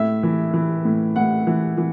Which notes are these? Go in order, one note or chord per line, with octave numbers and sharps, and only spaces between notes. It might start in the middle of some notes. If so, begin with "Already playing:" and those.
Already playing: A2 E5
E3
E3
A2
A2 F#5
E3
E3